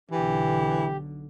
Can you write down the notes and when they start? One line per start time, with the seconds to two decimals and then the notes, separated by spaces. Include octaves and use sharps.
0.11 B1 D3 E3 G4